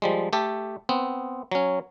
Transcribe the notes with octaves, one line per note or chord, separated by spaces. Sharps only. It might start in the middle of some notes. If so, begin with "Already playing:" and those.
F3 G3 G#3
A3 G4 A4
B3 C4
F#3 C#4